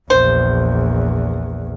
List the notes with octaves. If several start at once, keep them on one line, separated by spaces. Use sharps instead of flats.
A#1 E2 C5